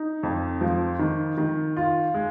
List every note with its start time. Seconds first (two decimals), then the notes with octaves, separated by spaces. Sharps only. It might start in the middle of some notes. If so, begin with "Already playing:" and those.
Already playing: D#4
0.23 F2
0.61 F3
0.99 D#3
1.38 D#3
1.77 F4
2.14 G#3